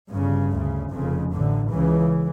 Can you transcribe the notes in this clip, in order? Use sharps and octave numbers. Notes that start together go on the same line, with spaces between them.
G1 G2 C#3
D2 C#3
F1 F2 C#3
A1 A2 D3
C#2 C#3 E3